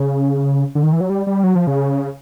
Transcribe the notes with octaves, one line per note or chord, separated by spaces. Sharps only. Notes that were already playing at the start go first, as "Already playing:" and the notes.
Already playing: C#3
D3
D#3
E3
F#3
G3
G3
F#3
F3
C#3